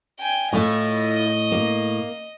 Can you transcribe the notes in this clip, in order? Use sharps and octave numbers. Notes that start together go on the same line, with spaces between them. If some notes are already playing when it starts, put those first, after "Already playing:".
G5 G#5
A2 A3 E4 F4 D#5
A#3